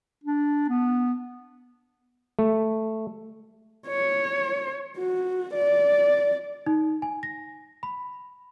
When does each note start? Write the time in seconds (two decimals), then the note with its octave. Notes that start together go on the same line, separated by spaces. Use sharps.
0.24 D4
0.69 B3
2.39 A3
3.88 C#5
4.98 F#4
5.54 D5
6.66 D#4
7.02 G#5
7.23 A#6
7.83 B5